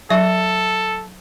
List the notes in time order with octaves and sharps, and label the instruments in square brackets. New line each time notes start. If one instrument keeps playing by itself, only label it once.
[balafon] F#3 [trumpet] A4 [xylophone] E5